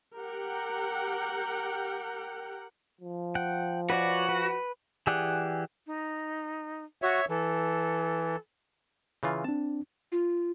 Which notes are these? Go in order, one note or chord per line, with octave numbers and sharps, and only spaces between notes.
G4 A#4 F#5 G5
F3
F#5 G5
F#4 B4 C#5 D5
B4
E3 G4 G#4 D5 F#5
D#4
F#4 C#5 E5
E3 A4
C#3 E3 F4
C4 D4 A5
F4